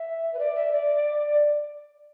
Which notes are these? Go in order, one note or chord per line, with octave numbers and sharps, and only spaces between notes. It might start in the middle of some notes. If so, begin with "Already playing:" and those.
Already playing: E5
B4
D5
E5
D5